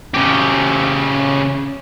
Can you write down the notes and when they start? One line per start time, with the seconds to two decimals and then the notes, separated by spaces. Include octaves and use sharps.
0.14 C#3 G4